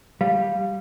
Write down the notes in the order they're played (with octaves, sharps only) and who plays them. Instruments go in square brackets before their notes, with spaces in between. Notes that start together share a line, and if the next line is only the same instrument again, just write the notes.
[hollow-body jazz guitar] G3 [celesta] F5